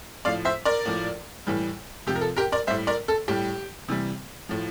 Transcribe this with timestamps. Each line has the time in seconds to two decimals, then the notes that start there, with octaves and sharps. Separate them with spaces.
0.25 A2 F3 D5 F5
0.45 C5 E5
0.65 A#4 D5
0.86 A2 F3
1.47 A2 E3 G3
2.07 C3 F3 G4
2.16 A#4
2.21 A4
2.36 G4 A#4
2.52 A#4 D5
2.67 G3 C5 E5
2.71 A2
2.87 A#4 D5
3.08 A4
3.28 A2 G3 G4
3.88 C3 E3 G3
4.49 A2 F3